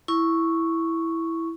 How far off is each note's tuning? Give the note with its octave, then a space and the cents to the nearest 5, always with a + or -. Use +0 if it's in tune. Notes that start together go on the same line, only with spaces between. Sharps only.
E4 +0 C#6 +0